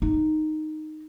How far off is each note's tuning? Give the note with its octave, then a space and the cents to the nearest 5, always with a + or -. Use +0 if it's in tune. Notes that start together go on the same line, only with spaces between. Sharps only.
D#4 -5